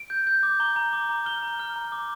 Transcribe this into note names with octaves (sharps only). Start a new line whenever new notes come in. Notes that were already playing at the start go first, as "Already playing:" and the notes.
Already playing: D7
G6
G6
D6
A#5 G7
A#5
D6
A#5
F6 G7
A#5
F6
A#5
D6